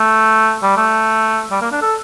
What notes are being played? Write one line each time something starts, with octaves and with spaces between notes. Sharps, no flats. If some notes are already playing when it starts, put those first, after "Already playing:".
Already playing: A3
G3
A3
G3
A#3
D4
A4